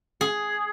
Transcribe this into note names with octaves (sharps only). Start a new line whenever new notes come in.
G#4